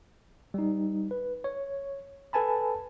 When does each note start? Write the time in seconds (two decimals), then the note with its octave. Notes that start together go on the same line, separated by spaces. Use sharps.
0.54 G3 D#4
1.11 B4
1.44 C#5
2.33 A4 B4 G#5 A5 B5